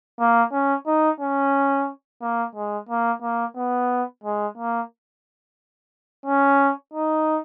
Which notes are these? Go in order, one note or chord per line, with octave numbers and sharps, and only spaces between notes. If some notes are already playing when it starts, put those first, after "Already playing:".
A#3
C#4
D#4
C#4
A#3
G#3
A#3
A#3
B3
G#3
A#3
C#4
D#4